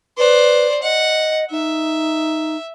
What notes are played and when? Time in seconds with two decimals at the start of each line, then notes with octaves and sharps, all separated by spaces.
0.18 B4 C5 D5
0.83 D#5 F#5
1.51 D#4 E5